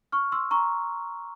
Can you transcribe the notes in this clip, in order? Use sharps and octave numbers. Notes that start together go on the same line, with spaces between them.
C#6 F6
C6 E6
A#5 C#6